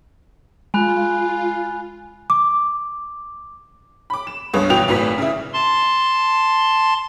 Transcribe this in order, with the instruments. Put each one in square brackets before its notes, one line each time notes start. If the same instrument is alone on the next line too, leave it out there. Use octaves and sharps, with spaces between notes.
[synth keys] G#3 [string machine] F4 [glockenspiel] G#5 B5 F#6
[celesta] D6
[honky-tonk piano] B5 D6
E7
C#2 G2 B3 C#5 D#6
B1 B2 E3 F#4 G5 F7
G#1 A2 F#3 B4 B6
C#3 E4
[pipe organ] A5 C6